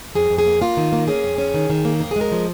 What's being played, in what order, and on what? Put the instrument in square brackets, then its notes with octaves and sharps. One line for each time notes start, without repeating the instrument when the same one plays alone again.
[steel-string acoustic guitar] F2 G#4
F2
G#4
A#3
A#3 F4
D#3
A#3
C#4 G#4
F2
C#4
D#3
D#3
A#3
F2 A#4
G#4
G#3 A#4
F3